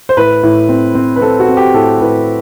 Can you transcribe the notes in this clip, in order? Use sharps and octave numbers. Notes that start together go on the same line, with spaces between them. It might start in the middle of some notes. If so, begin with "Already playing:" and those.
C5
A2 B4
A2
C4
C4
B4
C4 A4
F#4
C4
G4
A2 A4
A2 B4